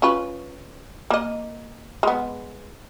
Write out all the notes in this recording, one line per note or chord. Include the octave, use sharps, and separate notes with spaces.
C#4 F4 B4
A#3 D#5
G#3 B3